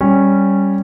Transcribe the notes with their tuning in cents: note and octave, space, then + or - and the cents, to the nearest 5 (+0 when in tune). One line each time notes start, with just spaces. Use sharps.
G3 +0 C#4 -10